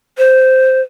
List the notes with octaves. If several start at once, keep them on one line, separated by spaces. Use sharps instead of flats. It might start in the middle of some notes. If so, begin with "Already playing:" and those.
C5